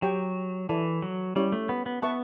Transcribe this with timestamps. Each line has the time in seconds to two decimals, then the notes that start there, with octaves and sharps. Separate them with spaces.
0.02 F#3 G4 C#5 G5 C#6
0.69 E3 E4 A4 D5 A5
1.02 F#3
1.36 G3 C#4 E4 G4 C#5
1.52 A3
1.69 B3
1.86 B3
2.02 B3 B4 E5 A5 C#6